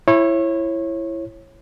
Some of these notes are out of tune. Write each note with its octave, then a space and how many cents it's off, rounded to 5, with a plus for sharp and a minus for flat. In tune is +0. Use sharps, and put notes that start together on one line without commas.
E4 +15 C#5 -25